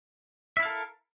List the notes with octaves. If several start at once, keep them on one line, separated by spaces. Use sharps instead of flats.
E4 A4 A#4 E5 F5